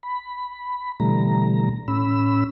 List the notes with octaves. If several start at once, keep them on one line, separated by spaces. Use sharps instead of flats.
B5
B2 D3 E3 G3 A3 A#5
A2 C#4 B5 E6